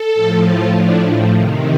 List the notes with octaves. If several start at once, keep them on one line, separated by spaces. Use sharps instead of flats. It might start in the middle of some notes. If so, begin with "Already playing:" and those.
Already playing: A4
A2 F3
F4
A2 F3 D4
C3 D#3